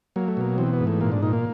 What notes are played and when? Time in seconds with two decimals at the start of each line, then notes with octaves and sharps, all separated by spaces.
0.16 F#3 A#3
0.28 A3
0.37 B2 A#3
0.58 E3 C4
0.73 B3
0.80 G#2
0.87 A3
1.01 A#2 A#3
1.12 D4
1.22 A#2 D#4
1.33 A#3